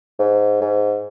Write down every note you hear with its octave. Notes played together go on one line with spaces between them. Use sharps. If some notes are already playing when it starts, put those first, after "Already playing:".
G#2
G#2